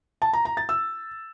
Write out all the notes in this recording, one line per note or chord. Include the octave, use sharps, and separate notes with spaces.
A5
A#5
A#5
A6
E6